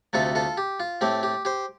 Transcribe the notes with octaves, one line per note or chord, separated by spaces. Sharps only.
D2 C3 A3 F4 A4
F4 A4
G4
F4
A2 A3 C4 G4
G4
G4 C5